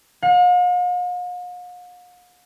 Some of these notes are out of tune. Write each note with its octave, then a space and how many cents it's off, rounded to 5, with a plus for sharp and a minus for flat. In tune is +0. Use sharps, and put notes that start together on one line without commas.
F5 +45